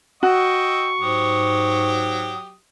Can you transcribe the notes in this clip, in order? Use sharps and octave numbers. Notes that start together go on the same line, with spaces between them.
F#4 D#5 G5 C#6 E6
G#2 F#3 G4 D#6